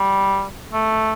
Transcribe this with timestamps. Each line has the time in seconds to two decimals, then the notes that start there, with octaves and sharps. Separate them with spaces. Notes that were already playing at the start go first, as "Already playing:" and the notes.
Already playing: G3
0.73 A3